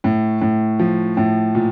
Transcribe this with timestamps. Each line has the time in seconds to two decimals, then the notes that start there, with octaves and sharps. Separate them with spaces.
0.04 A2
0.41 A2
0.79 F3
1.17 A2
1.55 A#2